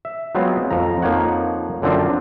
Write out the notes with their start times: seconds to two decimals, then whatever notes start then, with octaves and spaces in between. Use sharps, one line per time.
0.05 E5
0.35 F#3 G#3 B3 C4 F4
0.71 F2 F3 A#5
1.02 F2 F3 A#3 D#4 C#5 F#5
1.82 F#2 D3 F3 C4 D4 F4